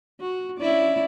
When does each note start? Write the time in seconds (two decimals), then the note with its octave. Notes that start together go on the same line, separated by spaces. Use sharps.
0.20 F#4
0.58 C#4 E4 D5